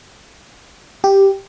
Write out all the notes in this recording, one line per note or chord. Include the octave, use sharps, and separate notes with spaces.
G4